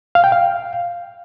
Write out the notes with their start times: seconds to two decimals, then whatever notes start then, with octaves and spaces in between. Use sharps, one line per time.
0.15 F5
0.24 G5
0.32 F5